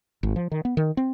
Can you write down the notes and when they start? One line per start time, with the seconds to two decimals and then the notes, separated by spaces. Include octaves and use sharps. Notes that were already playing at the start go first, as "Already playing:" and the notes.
0.23 G#1
0.36 F3
0.51 D#3
0.65 B3
0.77 D#3
0.97 C4